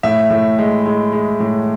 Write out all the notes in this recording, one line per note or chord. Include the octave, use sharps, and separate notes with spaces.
A2 E5
A2
G#3
G#3
G#3
A2